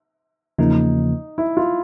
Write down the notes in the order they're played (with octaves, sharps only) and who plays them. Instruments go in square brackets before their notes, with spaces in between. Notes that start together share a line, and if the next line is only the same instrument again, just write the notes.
[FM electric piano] E2 C#3 F3 A#3 [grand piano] D#4
[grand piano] E4
F4